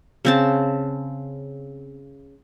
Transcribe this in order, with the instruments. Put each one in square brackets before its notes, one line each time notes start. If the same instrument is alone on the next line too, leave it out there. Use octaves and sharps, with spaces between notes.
[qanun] C#3 C4 A5